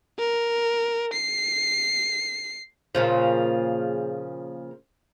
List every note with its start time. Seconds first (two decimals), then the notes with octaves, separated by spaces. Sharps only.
0.19 A#4
1.14 C7
2.95 A#2 C#3 F3